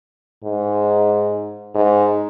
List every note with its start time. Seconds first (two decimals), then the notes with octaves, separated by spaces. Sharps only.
0.44 G#2
1.75 G#2